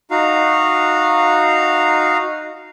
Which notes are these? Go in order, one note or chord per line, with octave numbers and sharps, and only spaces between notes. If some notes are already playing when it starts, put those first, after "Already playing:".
D#4 F#4 F5 A#5